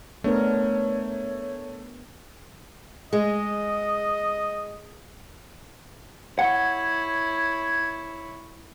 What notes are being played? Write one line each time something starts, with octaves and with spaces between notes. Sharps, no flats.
A3 B3 D4 A#4 C#5
G#3 D#5
E4 C#5 F#5 G#6